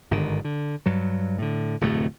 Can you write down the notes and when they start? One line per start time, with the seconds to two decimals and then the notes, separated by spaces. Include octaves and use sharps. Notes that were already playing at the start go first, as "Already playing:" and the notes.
0.11 G1 G#2 D3 D#3
0.45 D3
0.86 G2 F#3
1.38 A2 D3
1.81 D1 F2 C3 A3